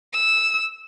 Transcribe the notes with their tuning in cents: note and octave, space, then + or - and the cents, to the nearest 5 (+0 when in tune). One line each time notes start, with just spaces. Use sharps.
E6 -5